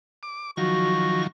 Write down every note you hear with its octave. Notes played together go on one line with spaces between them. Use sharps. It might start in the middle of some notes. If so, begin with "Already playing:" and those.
D6
D#3 F3 F#3 F#4 C#6 A#6